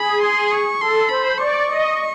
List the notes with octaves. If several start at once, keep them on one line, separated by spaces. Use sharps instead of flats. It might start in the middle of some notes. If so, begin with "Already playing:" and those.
Already playing: G#4 B5
C6
C#6
A4 C6
C5 B5
D5 C#6
D#5